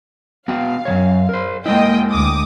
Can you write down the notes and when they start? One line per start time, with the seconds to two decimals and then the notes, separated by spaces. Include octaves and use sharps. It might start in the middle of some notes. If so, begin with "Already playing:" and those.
0.48 B3 F#4 F5 G5
0.85 F#2 E3 C#5
1.29 A#4 C5
1.66 G#3 A#3 E4 D#5 G5
2.12 D2 D6 D#6